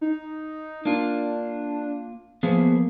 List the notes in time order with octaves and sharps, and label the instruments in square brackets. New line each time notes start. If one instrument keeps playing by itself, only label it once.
[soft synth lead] D#4
[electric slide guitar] A#3 F4 [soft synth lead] D4
[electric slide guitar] F3 B3 G#4 [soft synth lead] A#3